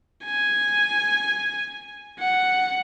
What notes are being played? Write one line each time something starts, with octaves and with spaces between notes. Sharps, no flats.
G#5
F#5